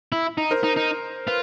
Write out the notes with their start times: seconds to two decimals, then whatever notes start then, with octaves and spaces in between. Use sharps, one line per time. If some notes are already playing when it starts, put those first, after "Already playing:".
0.12 E4
0.38 D#4
0.51 A#4 C5
0.63 D#4
0.76 D#4
1.27 F4 B4